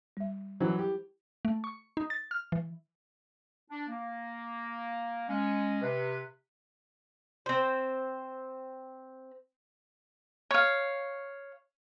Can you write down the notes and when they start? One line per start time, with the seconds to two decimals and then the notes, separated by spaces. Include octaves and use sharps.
0.17 G3 E5
0.60 E3 F#3 E4 C5
0.78 G4
1.45 A3
1.64 C#6
1.97 D#4
2.10 A6
2.31 F6
2.52 E3
3.71 D4
3.88 A#3
5.29 G#3 C#4
5.82 C3 B4
7.46 C4 C5
10.51 C#5 F5